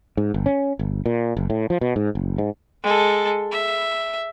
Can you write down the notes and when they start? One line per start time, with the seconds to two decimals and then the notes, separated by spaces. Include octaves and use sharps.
0.17 G#2
0.34 G1
0.46 C#4
0.79 G1
1.06 A#2
1.37 F#1
1.50 A2
1.70 F3
1.81 B2
1.96 G#2
2.15 F#1
2.38 G#2
2.83 G#3 A4
3.51 E5